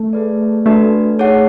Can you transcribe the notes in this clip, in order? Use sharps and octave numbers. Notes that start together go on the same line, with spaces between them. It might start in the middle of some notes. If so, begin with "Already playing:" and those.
Already playing: A3
G#4 B4 D5
A3 D4 F#4 B4 D5
D#4 G#4 C#5 F#5